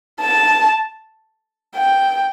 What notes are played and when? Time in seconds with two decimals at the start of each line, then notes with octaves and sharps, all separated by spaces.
0.21 A5
1.75 G5